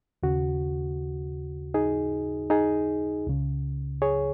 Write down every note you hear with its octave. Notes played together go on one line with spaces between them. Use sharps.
D#2 C#3 F#4
D#4 G#4
D#4 G#4
C#2 C#3
G#4 C#5